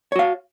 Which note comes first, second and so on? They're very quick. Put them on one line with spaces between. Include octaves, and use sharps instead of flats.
C#5 F#4 F5